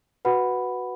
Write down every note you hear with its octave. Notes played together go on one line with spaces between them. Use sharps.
F#4 B4 F#5 B5